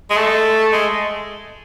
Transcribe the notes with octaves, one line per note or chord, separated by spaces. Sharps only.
G#3
A3
G#3